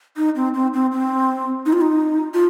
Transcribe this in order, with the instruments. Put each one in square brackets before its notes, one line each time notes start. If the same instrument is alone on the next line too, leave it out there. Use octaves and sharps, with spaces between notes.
[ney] D#4
C4
C4
C4
C4
D#4
F4
D#4
F4